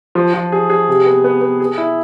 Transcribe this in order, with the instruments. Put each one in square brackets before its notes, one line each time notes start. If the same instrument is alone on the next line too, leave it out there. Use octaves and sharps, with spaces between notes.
[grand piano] F3
F3
G#4
G#4
C3
B3
B3
B3
G#4
E4